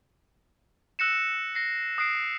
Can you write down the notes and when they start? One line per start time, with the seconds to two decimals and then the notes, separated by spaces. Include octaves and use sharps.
0.99 E6 F#6 A#6 C#7 E7
1.55 A#6 C7
1.98 D#6 F#6 C7 D7